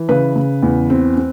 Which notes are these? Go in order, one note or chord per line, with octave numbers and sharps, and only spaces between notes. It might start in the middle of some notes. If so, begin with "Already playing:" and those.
Already playing: E3
C#3 B4
C#3
E2
C4
C4